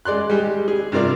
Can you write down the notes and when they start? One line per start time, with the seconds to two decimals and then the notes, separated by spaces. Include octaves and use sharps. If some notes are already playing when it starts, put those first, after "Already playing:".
0.05 G#3 D5 C6 F#6
0.30 G3 G#3 G4
0.68 G#4
0.92 G2 C3 F4 A#4 D5